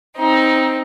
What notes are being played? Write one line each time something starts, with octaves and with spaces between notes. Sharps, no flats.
C4 D#4